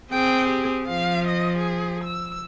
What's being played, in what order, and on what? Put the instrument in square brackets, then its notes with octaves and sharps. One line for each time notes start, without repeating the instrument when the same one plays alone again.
[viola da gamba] C4 G#4 [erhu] G5
[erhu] G4
[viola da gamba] F3 [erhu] F5
[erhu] D#5
G#4
E6